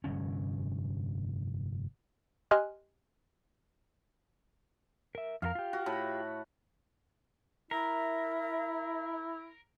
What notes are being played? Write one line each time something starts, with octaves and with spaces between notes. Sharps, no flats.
F1 G2 D3 C#4
G4 D#5 G#5 C6 F6 F#6
A#4 E5
F2 F4 A#4 F5
F4 G4
F#4
A2 B5
E4 A#4 E5